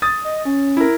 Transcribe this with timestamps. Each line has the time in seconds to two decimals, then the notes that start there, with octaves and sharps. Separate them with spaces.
0.02 D#6 A6
0.24 D#5
0.45 C#4
0.77 E4 A#4